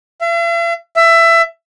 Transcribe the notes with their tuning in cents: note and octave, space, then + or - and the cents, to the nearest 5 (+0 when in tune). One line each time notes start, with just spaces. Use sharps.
E5 +45
E5 +20